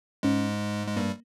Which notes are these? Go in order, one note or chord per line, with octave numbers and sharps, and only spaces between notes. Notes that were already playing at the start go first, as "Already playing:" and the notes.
G#2 G#3 C#4
G#3
G2 G3 A#3